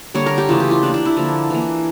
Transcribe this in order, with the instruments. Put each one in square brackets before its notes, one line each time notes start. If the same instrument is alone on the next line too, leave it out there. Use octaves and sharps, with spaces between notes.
[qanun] D3 G3 A#3 C#5
A#4
G4
C#3 E3 A3 F4
G4
F4
E3 A#3 D4
D4
E4
D3 F3 A#3
E3 A#3